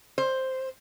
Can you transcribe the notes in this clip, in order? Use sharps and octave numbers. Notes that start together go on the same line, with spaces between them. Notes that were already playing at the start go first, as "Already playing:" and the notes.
C5